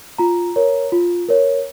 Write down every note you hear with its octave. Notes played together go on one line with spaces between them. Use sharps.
F4 A#5
A#4 C#5
F4
A#4 C#5